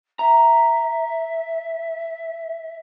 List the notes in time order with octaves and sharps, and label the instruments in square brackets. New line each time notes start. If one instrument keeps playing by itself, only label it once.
[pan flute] E5 [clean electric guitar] A#5